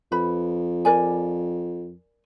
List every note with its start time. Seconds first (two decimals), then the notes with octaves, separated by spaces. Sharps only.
0.12 F2 B4 B5
0.85 A#4 D5 G#5